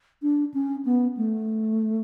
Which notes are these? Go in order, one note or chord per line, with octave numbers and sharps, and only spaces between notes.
D4
C#4
B3
A3